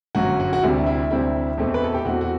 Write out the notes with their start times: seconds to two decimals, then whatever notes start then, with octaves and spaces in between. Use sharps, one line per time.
0.15 G1 F#2 F#3 F#4
0.40 F#4
0.53 F#4
0.62 D2 C3 G3 C4 E4
0.87 E4
1.11 D2 C3 G3 C4 E4
1.58 E2 B2 A3 C4
1.74 B4
1.84 A4
1.94 G4
2.05 E2 B2 A3 C4 F#4
2.21 F#4